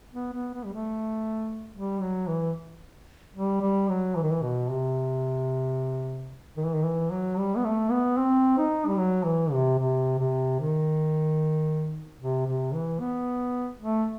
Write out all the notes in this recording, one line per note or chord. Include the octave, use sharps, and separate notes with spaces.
B3
B3
B3
G3
A3
G3
F#3
E3
G3
G3
F#3
E3
D#3
E3
B2
C3
D#3
E3
D#3
E3
F#3
G3
B3
A3
B3
C4
D#4
G3
F#3
E3
C3
C3
C3
D#3
C3
C3
E3
B3
A3